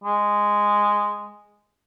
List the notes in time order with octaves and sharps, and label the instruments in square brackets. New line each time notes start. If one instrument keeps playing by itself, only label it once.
[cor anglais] G#3